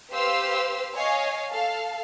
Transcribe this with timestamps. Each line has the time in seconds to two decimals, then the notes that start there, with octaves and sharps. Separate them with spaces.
0.11 G4 B4 C5 F5 C6 E6
0.97 C#5 D#5 F5 G#5
1.51 A4 F5 A5